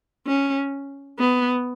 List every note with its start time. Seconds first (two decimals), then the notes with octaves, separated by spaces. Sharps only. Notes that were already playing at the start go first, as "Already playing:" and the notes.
0.27 C#4
1.19 B3